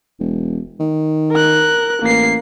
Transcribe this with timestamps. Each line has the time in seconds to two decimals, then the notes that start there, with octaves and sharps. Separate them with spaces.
0.19 E1
0.80 D#3
1.31 A#4 F#6
2.02 A1 A#3 C7